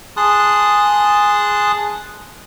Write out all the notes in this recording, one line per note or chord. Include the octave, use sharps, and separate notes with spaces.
G#4 A5 C6 D#6 F#6